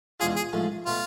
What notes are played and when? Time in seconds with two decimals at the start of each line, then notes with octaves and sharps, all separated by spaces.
0.20 E2 B2 G#3 D4 F4 G#4
0.36 G#4
0.53 A1 G#2 F3 A3
0.86 B2 A3 F4